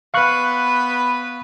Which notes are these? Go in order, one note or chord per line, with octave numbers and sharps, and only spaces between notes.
B3 B4 F5 C#6 F#6